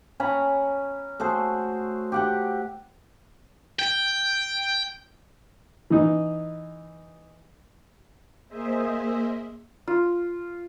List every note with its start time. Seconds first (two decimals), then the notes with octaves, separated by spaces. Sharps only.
0.20 C#4 G#5 A#5 B5
1.20 A3 F#4 G#4 C5
2.12 G4 F#5 G5
3.79 G5
5.90 E3 D#4
8.48 A#3 G#4 C5 D#5 E5
9.87 F4